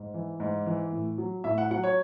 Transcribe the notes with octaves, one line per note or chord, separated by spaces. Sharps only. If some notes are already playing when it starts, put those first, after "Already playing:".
Already playing: G#2
E3
G#2
E3
A2
F#3
A2 E5
F#5
F#3 F#5
C#5